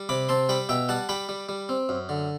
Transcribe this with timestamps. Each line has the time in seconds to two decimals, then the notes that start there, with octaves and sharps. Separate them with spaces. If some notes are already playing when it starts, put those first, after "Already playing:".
Already playing: G3
0.09 C3 B5 D6
0.29 C4 A5 C6
0.49 G3 G5 B5
0.69 B2 E5 G5
0.89 G3 F#5 A5
1.09 G3 G5 B5
1.29 G3
1.49 G3
1.69 C4
1.89 F#2
2.09 D3